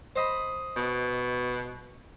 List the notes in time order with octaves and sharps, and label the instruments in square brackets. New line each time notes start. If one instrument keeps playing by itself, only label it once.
[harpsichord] C5 D#5 B5
[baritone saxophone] B2